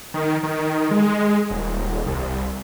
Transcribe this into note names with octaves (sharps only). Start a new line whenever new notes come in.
D#3
D#3
G#3
D#1
C2